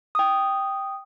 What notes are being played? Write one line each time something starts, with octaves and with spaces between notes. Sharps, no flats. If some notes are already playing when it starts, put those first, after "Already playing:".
G5 D#6